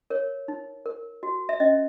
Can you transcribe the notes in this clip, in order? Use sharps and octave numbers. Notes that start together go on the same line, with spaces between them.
A#4 C#5
D#4
A#4
F#4
E5
C#4 D#5